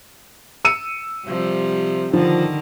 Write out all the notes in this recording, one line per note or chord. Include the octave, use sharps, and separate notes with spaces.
E6 C#7 D#7
C3 F3 G3
D3 D#3 F3